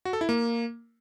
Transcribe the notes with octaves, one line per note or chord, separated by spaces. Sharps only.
F#4
A4
E4
A#3